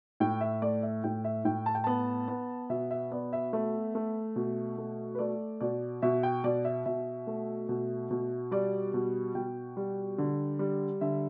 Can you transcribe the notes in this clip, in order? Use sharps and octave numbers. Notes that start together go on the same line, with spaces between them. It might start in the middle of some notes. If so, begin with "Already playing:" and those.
A2 G5
E5
A3 D5
E5
A2 G5
E5
A2 G5
A5
G5
B3 A5
B3
B2 E5
E5
B3 D5
E5
A3 E5
A3
B2
A3
B4
A3 D5
B2 D5
B2 E5
G5
B2 D5
E5
B2 E5
A3
B2
B2
G3 D5
B2
B2 G5
G3
D3
G3
D3 E5